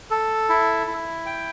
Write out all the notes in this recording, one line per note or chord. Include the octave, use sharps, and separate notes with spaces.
A4
E4
E4
G5